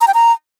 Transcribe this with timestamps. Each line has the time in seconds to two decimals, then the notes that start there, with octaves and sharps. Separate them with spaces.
0.01 A#5
0.07 G5
0.14 A#5